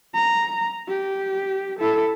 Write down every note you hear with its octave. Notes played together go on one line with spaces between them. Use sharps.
A#5
G4
E4 A4